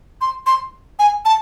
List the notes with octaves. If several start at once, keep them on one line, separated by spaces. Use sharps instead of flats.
C6
C6
G#5
A5